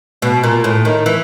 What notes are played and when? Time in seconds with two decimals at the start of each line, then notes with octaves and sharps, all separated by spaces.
0.22 B2
0.43 A#2
0.64 A2
0.85 D#3
1.06 E3